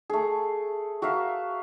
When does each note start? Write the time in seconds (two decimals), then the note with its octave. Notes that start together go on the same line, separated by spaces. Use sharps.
0.10 A3 G#4
1.02 F#4 A#4 E5 F5